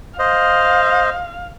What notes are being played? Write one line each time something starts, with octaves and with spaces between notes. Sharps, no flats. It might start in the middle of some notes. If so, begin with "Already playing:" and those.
C5 D#5 F5